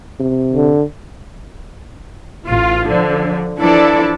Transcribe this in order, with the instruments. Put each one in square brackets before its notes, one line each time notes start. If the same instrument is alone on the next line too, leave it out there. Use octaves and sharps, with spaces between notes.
[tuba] C3
[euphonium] D3
[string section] A1 F4
D3 F3
E3 F3 D4 E4 A4 D5